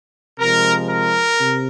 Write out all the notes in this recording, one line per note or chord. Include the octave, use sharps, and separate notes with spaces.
C3 F3 G#3 A#4
A#4
C3